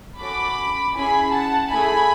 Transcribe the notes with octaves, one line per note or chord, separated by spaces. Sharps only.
C#4 F#4 A4 B5 D6
C#4 E4 G#4 G#5 B5
F#5 A5
A3 E4 G#4 G#5 B5